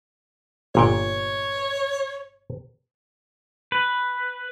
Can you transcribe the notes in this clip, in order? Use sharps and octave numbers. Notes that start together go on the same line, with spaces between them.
G1 A#2 C#5 G5
B4